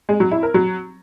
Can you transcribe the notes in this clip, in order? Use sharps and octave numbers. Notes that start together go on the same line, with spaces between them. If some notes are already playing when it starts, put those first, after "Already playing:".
G#3
F#3
E4
A#4
F#3